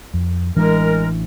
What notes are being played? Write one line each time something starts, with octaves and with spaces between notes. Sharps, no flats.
F2
A1 E3 G#3 D4 A#4